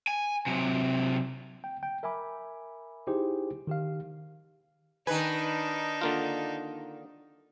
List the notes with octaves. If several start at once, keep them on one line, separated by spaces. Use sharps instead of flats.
G#5
C3 F#3
G5
G5
A#4 E5 G#5 B5 D6
D#4 E4 G4 G#4 C5
D#3 G4 F5
D#3 D4 D#4 B4 G#5
D3 A#3 F4